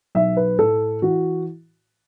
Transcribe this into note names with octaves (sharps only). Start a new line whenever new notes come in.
B1 E5
B4
A2 A4
E3 F#4